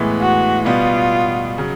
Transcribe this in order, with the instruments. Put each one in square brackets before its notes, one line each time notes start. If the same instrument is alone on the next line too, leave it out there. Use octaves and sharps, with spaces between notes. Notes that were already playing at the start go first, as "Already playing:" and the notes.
Already playing: [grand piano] A2 E3 G#3 B3
[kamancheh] F#4
[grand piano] B2 G3 B3 [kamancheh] F4
[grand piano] C#3 F#3